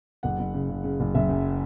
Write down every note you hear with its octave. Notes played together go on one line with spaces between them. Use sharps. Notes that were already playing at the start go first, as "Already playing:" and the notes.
F#1 F#5
F#1
C#3
C#3
C#3
F#1
F#1 E5
F#2